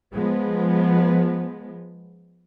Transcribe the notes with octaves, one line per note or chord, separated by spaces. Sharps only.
F3 G#3 B3